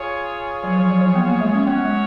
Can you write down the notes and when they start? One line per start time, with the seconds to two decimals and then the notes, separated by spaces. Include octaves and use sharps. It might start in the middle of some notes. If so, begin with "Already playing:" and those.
Already playing: F4 G#4 C#5
0.63 F#3
0.77 F3
0.90 F#3
1.01 F3
1.15 B3
1.27 A#3
1.41 G#3
1.54 C#4
1.66 B3 C#4 F#4 C#5 F#5
1.85 G#3